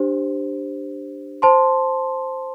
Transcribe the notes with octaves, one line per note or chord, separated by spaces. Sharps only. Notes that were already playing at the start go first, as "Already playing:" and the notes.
Already playing: D4 G4 C5
C5 A5 C6